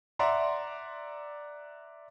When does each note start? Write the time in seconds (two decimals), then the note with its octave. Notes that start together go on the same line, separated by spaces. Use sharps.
0.19 D5 E5 F#5 A#5 C6